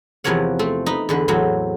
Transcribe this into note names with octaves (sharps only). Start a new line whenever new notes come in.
E2 C3 F3 A#4 C#5 F#5
A3 C4
D#4 B4
E2 D3 B4
E2 A2 F#3 C4